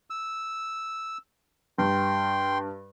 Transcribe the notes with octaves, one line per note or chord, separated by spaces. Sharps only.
E6
G2 G5 C6